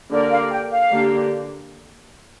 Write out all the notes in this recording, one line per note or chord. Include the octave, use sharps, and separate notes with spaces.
D3 A#3 G4 A#4 D5
F5
G5
F5
D3 A#3 D4 G4